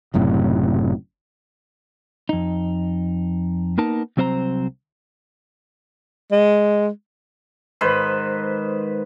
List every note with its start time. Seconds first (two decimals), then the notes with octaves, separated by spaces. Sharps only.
0.14 F#1 F#2 A2 C3
2.29 F2 D#4
3.78 A#3 B3 D#4 A#4 A5
4.17 C2 F#3 C4 C5 D#5 A#5
6.32 G#3
7.81 G#2 D#3 B4 C5